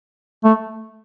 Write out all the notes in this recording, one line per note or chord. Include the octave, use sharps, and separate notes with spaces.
A3